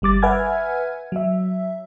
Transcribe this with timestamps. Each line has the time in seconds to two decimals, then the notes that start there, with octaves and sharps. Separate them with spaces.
0.02 G1 G3 D6 A6
0.22 B4 E5 F#5 G#5 F6 G#6
1.12 F#3 E5